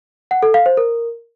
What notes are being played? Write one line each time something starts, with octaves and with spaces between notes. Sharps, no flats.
F#5
A4
F5
C5
A#4